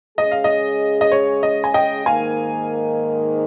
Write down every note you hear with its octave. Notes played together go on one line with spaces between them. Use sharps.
C#3 G#3 C#4 G#4 D#5
F5
D#5
D#5
C#5
D#5
G#5
D#5 G5
G#2 D#3 A#3 F5 G#5